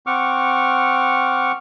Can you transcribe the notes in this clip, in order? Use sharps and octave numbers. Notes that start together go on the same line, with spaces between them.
C4 F#5 C#6 D6 F6